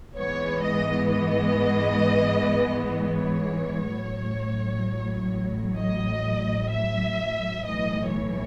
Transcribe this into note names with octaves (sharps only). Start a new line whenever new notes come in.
G#2 E3 G#3 B3 C#5
D#5
D#5
C#5
A1 A2 F#3
D#5
E5
B1 A2 E3 D#5
C#5